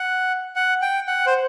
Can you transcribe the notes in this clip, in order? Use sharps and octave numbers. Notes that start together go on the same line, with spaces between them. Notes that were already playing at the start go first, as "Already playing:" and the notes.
Already playing: F#5
F#5
G5
F#5
C5